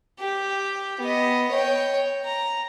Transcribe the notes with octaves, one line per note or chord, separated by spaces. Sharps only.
G4
B3 D#5
C#5 G5
A#5